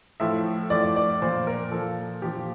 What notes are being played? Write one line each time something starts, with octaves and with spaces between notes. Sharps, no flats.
A2 F3 E5
A2 F3 D5
D5
A#2 F3 C5
A#4
A#2 F3 A4
A#2 F3 G4